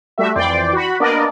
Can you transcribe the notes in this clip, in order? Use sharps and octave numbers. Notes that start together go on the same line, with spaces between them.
G3 A3 F#4 E5
F2 E3 D5 G5 C6 D6
F#4 B5
A#3 B3 D4 A#4 D5 D#5